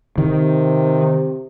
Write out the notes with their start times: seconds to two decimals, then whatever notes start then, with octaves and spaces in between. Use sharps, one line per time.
0.18 C3 D#3